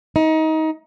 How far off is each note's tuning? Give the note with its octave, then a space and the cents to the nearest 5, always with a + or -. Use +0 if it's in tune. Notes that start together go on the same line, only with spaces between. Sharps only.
D#4 +25